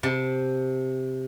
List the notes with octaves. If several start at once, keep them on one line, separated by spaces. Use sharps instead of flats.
C3 A5